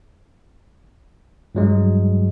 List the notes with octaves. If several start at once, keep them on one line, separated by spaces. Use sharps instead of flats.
G2 F#3 G#3